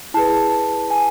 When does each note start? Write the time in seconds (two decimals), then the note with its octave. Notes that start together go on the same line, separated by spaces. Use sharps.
0.14 E4 G#4 B4 A5
0.90 G#5